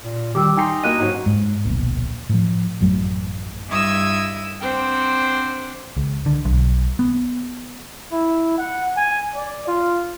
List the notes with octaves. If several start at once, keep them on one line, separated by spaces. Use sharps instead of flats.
A#2
D#3 G3 D6 E6
D#4 G5 G#5 C6 C7
A#3 F#4 D#5 F#6 D#7
G#2 F#3 C#4 D#4
G#2
D1 A#1 B2
A2 F3
A1 F#2 F#3 A3
G2 E4 D#5 E6 G#6
C4 D4 C5 F#5 G5
C#2
D3
B1
B3
E4
F#5
G#5
D5
F4